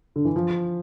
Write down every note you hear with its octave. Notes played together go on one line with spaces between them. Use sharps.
D3
E3
F3